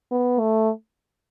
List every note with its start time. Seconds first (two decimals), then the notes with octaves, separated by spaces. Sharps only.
0.11 B3
0.40 A3